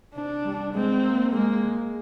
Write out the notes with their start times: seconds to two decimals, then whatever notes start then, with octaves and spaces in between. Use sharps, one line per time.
0.15 C3 D4
0.45 G3
0.74 G#3 C4
1.03 A#3
1.32 G#3 A#3